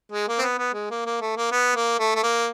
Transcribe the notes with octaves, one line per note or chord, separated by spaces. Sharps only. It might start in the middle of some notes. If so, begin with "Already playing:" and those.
G#3
A#3
C4
B3
B3
G#3
A#3
A#3
A3
A#3
B3
A#3
A3
A3
A#3